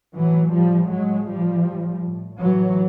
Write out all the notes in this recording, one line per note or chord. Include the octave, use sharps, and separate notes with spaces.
A2 E3 F#3
A2 F3 G3
A2 F#3 G#3
A2 F3 G3
A2
A2
A2 E3 F#3